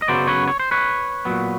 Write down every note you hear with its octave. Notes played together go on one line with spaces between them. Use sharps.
D#5
F#2 C#3 F#3 B3 C5 D5
B4 C#5
C#5
C5
B4 C#5
A#2 F#3 B3